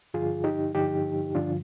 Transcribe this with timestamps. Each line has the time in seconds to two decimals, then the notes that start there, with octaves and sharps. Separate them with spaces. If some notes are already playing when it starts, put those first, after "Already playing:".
0.14 G2 D3 F3 F4 G#4
0.44 D#4 G4
0.75 G2 D3 F3 D#4 G4
1.35 G2 D3 F3 D4 F4